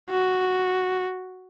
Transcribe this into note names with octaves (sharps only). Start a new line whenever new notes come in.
F#4